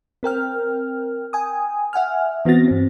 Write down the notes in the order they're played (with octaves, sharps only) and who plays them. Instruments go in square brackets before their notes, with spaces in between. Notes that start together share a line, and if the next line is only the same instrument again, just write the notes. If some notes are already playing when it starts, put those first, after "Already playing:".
[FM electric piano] C4 A#4 G5 F6
G5 G#5 D#6
E5 F#5 G#5 F6
E3 B3 C4 F#4 A6 A#6
G2 C4